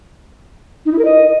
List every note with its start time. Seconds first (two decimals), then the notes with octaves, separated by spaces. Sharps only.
0.85 D#4
0.92 E4
0.98 A#4
1.05 D#5